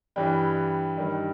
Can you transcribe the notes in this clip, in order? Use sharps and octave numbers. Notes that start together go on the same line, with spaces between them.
G2 E3 G3 G5
G2 D#3 G3